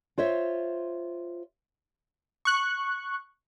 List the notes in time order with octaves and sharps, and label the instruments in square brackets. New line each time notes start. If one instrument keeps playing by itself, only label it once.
[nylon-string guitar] F4 C5 C#5 E5
[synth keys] C#6 F#6